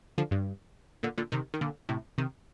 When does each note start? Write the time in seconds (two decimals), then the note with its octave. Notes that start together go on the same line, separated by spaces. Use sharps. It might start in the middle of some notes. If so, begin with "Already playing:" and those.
0.18 D3 F3
0.31 G2
1.03 A#2 D3
1.18 A#2 D3
1.32 C3 D#3
1.54 D#3
1.61 A#2 D3
1.89 A2 C3
2.18 C3 D#3